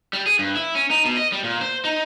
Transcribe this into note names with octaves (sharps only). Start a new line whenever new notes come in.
G3
G#4
G2
E4
C#4
D#4
B2
D#5
G3
A#2
C5
D#4